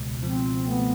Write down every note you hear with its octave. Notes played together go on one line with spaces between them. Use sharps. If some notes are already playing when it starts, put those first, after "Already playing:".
Already playing: C#2 B2
F3 C4
A3 B3